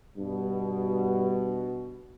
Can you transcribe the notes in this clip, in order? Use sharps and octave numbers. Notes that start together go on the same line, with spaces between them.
G2 B2